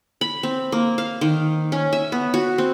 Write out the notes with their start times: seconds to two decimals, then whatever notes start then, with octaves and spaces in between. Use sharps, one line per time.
0.21 B5
0.43 C4
0.72 A#3
0.98 F5
1.21 D#3
1.72 C#4
1.93 E5
2.12 B3
2.34 F#4
2.58 C4